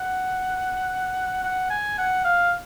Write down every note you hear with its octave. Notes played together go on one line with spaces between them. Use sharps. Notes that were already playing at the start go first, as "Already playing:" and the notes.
Already playing: F#5
F#5
G#5
F#5
F5